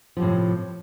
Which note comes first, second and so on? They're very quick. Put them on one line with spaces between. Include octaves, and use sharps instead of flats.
F3 C3 A2